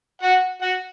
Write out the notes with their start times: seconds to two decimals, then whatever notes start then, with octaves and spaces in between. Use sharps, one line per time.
0.22 F#4 F#5
0.62 F#4 F#5